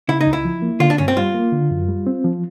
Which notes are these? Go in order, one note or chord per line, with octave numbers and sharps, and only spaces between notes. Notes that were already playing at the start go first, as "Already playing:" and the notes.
C#3 E4
D#4
C#2
E4
F3
A#3
D3 F4
D4
G2 C#4
C4
G3 F4
A#3
D3
F#2
G3
C4
F3